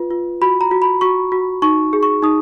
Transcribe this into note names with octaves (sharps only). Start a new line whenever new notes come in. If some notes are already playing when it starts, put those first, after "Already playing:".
Already playing: F4 B4
F4
F#4 B5
A#5
F#4
B5
F#4 C#6
F#4
D#4 C#6
G#4
C#6
D#4 D#6